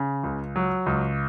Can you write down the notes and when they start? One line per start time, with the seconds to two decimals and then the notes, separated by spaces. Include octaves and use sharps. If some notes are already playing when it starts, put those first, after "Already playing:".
Already playing: C#3
0.24 C#2
0.56 F#3
0.86 C#2